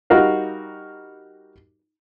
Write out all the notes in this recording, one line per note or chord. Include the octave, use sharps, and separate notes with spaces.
G3 D#4 F#4 A#4 F5